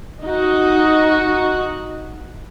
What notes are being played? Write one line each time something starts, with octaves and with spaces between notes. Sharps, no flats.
D#4 F#4